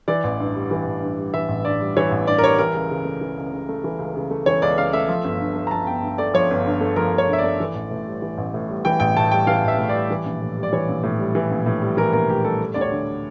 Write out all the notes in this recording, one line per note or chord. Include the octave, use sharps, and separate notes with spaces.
E3 D5
A1
G2
G3
E3
A1
G2
G3
E3 E5
A1
G2 D5
G3
E3 C#5
A1
G2 D5
A#4
G3 C#5
E3 A#4
C#2
C#3
A3
E3
C#2
C#3
A3
E3
C#2
C#3
A3
E3 C#5
C#2 D5
C#3 F5
A3 E5
F3
G1
G2
A3
A#5
F3 A5
G1 G5
G2
A3 D5
F3 C#5
G1
G2
A3
F3 A#4
G1
C#5
G2
E5
D5
A3
E3
A1
A2
G3
E3
A1
A2
G3
E3 G5
A1 G5
A2 A5
G3 G5
E3 F5
A1 E5
A2
G3 D5
E3
A#1
A2
G3
D5
E3 C#5
A#1
A2
G3
E3
A#1
A2
G3
E3 A#4
A#1 A#4
A2 G4
G3 A4
A3
D2 D5
C#5
D3